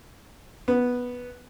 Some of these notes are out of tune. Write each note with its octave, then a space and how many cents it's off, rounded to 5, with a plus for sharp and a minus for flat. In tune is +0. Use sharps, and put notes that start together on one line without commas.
B3 -5